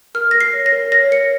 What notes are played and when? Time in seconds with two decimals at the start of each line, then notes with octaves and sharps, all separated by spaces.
0.15 A#4 F6
0.31 A#4 A#6
0.41 C7
0.53 C#5
0.66 A#6
0.72 A#4
0.92 C#5 A#6
1.11 A#4 C#7